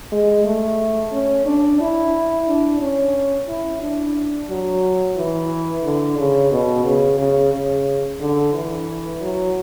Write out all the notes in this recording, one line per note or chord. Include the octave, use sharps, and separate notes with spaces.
G#3
A3
C#4
D4
E4
D4
C#4
E4
D4
F#3
E3
D3
C#3
B2
C#3
C#3
C#3
D3
E3
F#3